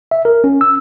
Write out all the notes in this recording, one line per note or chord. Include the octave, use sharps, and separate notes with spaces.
E5
A#4
C#4
E6